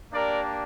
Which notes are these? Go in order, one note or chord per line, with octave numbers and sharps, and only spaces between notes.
A#3 D4 G4 A#4 D5